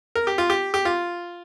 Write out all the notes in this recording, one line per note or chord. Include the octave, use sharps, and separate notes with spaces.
A#4
G4
F4
G4
G4
F4